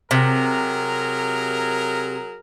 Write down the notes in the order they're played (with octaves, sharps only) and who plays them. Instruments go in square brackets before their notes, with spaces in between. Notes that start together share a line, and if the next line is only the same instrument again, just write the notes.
[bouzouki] C3 [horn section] F#3 G#4 A#4